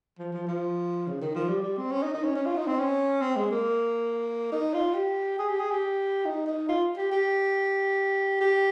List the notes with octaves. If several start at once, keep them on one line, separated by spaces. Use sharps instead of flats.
F3
F3
F3
C#3
D#3
F3
G3
G3
C4
C#4
D#4
D#4
C#4
C#4
F4
D#4
C4
C#4
C4
G#3
A#3
D#4
F4
G4
G#4
G4
G#4
G4
D#4
D#4
F4
G4
G4
G4